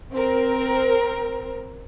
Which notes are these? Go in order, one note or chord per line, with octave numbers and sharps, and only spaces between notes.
C4 A#4